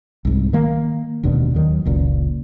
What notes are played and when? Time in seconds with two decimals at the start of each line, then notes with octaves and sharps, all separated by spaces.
0.25 C2 G#2
0.53 D#3 A#3
1.23 F1 D#2 B2 D3
1.54 D#2 D#3 F#3
1.85 F#1 C#2 A#2